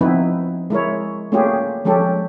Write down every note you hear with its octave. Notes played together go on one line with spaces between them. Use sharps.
F3 B3 C4 D#4 E4 B4
G#3 E4 A#4 C#5
A3 A#3 C#4 F4 G4 G#4
F3 G#3 C#4 G4 A4